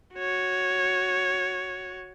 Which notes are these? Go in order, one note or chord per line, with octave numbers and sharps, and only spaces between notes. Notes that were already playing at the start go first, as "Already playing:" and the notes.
F#4 C#5